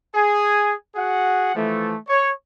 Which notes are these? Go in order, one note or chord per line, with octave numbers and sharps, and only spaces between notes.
G#4 G#5
F#4 G#4 F#5
E3 F3 A3
C#5